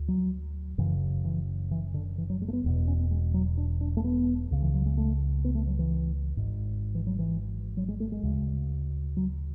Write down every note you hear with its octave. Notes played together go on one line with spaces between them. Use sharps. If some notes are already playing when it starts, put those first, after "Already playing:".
Already playing: D2
F#3
F#1 F#2 C#3 E3
E3
E3
D3
E3
F#3
G#3
A3
B3
E1 E2 B2
C#4
B3
G#3
F#3
D4
D4
A3
B3
C#2 C#3
E3
F#3
G#3
A3
B3
A3
F#3
E3
G#1 G#2
E3
F#3
E3
F#3
G#3
A3
G#3
D2 C#3
F#3